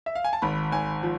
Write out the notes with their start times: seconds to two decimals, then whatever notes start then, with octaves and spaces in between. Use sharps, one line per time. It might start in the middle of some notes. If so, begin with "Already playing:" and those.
0.06 E5
0.15 F5
0.24 G#5
0.33 A5
0.42 G#1 B5
0.72 G#1 G#5
1.03 F3